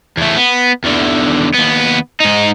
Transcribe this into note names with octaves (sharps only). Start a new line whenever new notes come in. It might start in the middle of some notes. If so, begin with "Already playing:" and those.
E2 A3
B3
E2 D3
D#2 B3
G#2 D#4